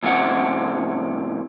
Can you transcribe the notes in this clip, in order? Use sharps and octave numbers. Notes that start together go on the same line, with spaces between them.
F2 A2 C#3 C4 F#5